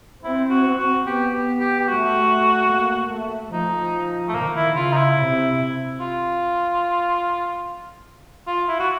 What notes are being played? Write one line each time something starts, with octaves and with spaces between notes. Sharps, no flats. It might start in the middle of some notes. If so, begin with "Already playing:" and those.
C4 E4
F#4
C4
F#4
B3 G4
G4
G4
G4
A3 F#4
A#3
A3
F3 D#4
A3
D#3 A#3
E4
C#3 F4
D#4
E4
C3
F4
F4
E4
F#4